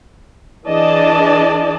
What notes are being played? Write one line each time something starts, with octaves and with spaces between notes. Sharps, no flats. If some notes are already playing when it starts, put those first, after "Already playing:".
E3 D4 G#4 D5 D#5 A5